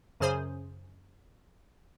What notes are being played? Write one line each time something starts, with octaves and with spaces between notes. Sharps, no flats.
F#2 C#3 G#4 C5 G#5